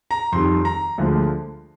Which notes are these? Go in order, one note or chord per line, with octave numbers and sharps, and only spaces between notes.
A#5
F2 D#3 G3 C6
A#5
D2 D3 F3 G#3